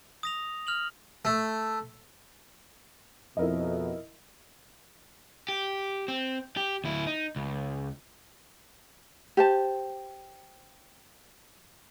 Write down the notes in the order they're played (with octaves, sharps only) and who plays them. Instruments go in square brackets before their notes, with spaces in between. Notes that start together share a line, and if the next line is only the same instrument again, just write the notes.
[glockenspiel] D#6 A#6 F7
F6 F7 F#7
[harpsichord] A3
[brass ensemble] F2 B2 [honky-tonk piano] E4 A#4 D#5
[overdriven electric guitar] G4
C4
G4
D2 E4
D#4
C#2
[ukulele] G4 C5 A5